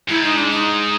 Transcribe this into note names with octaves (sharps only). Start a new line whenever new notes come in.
G#2 E4
D#4
D4
D#4